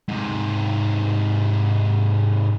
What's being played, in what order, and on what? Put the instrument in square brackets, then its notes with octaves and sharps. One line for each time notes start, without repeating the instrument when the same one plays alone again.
[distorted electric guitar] G#2 C3